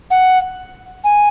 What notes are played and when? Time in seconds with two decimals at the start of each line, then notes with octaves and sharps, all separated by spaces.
0.11 F#5
1.04 G#5